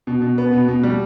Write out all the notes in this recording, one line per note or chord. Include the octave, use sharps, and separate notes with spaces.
B2
B2
B3
B2
B2
G3